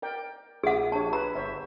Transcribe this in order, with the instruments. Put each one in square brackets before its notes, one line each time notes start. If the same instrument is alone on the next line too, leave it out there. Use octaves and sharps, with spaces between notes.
[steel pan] A#4 D5 G5
[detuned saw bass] A#1 [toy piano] G#4 F#5 [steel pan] D6 D#6
[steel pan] D4 G4 C#5 [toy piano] A5
[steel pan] B4 [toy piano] A#5
[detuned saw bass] G1 [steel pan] C5 C#5 E5